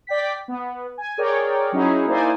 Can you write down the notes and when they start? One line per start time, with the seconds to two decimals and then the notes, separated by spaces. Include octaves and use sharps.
0.07 D5 G5 B6
0.48 B3
0.98 G#5
1.18 G#4 A#4 C#5 D5 G5
1.72 F#3 C#4 D#4 E4 G#4
2.07 A#3 D#4 E4 C5 D5 G#5